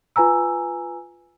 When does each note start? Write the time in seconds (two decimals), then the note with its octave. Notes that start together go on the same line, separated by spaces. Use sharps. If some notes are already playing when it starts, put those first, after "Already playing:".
0.16 F4 B4 G#5 A#5 E6